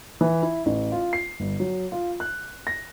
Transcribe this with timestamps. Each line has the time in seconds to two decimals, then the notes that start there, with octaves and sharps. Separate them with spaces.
0.21 E3
0.43 E4
0.66 A1
0.92 F4
1.13 C7
1.40 G1
1.60 F#3
1.92 F4
2.20 F#6
2.67 A#6